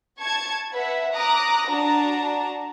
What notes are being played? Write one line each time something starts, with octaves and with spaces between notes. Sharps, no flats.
A5 C#6 G#6
B4 E5 F#5
A#5 D6 D#6 F#6 A#6
D4 F#4 A5 A#5